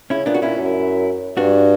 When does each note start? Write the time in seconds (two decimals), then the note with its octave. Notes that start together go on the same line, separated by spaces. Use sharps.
0.10 C#3 C#4 E4
0.26 A#2 B3 D4
0.34 F#4
0.42 A#2 C#4 E4
0.58 F#2
1.37 G2 D4 F#4